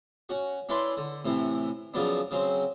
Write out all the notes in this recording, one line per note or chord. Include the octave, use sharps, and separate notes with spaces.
C#4 F#4
C#4 D4 E4 B4 B5 C6
D3
A2 C3 E3
C#3 F3 F#3 B3 D4
C#3 F#3 C4